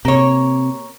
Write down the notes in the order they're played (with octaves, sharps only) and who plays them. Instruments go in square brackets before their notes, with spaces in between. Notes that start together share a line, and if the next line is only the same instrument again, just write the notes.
[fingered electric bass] C3 [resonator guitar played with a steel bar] A#3 C#5